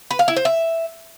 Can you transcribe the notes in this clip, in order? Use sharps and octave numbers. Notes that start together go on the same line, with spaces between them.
B4
F5
E4
C5
E5